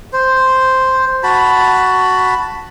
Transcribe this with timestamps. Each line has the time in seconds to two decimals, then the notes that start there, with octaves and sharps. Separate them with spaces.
0.13 C5
1.23 F#4 A5 B5